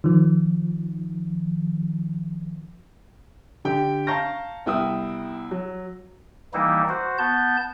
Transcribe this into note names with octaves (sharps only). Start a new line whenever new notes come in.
D#3 F3
D3 G4 G5
F5 A5 A#5 C#6 G6 A#6
C2 B3 E4 G5 D#6 E6
F#3
E3 G3 A#3 D#4 E4
F#4 C5
B3 A5 G6